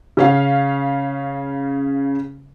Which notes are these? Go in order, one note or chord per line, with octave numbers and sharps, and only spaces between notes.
C#3 C#4 F5